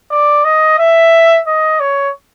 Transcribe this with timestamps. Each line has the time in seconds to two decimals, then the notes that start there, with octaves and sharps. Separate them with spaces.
0.11 D5
0.45 D#5
0.79 E5
1.47 D#5
1.80 C#5